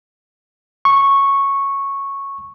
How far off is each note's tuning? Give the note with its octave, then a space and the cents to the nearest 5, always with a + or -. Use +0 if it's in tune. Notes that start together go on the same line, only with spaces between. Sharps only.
C#6 -10